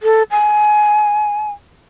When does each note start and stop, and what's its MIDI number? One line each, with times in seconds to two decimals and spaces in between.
0.03 0.23 69
0.31 1.51 80